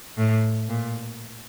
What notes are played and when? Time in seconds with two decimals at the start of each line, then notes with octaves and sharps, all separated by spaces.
0.18 A2
0.69 A#2